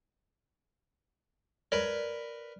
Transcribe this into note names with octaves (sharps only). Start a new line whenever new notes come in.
A#4 B4 D5